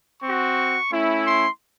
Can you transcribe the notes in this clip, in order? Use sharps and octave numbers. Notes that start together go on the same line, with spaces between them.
C4 F#4 C#6
A3 C#4 E4
C6